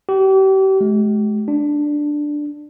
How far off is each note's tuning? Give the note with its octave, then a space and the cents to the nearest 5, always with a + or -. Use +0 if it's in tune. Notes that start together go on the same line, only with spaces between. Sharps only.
G4 -35
G#3 +35
D4 +5